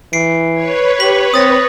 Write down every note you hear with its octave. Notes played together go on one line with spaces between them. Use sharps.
E3 C7 D7
B4 C#5
G4 B6 F#7
C4 D#6 A6 A#6